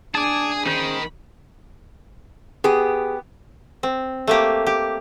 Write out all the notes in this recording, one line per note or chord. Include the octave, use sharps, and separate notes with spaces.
D4 G#4 G#5 A5 D6
D#3 C#4 G#4 C5 B5
B3 G4 G#4
C4
A3 A#3 G4
G4